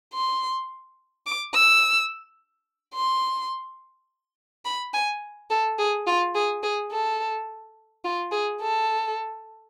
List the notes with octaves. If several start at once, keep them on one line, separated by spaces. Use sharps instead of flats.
C6
D6
E6
C6
B5
G#5
A4
G#4
F4
G#4
G#4
A4
F4
G#4
A4